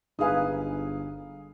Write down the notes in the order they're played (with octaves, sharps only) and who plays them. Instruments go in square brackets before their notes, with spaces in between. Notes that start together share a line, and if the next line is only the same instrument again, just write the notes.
[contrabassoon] G1 [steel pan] D#4 G#4 B4 [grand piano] F5 D#6